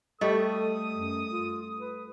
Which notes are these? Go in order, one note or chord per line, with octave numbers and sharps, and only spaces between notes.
G3 A3 A4 D#5 C#6 D#6
F#2
F4
B4